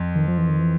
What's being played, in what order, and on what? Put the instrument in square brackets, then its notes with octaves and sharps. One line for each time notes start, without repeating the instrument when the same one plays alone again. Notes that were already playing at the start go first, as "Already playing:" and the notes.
Already playing: [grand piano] F2
[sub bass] D#3
F3
E3
D#3
E3